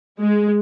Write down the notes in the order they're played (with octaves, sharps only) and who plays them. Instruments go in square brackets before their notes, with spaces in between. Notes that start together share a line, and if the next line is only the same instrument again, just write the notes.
[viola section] G#3